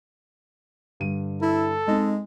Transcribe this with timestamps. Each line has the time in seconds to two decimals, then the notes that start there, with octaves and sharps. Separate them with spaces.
1.00 G2 D3 D#7
1.42 E4 A4
1.88 G#3 C4 D#4